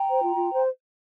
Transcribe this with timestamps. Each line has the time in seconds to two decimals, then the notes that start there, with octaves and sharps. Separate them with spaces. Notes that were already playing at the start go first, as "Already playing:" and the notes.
Already playing: G5 A#5
0.08 C5
0.22 F4
0.36 F4
0.51 C5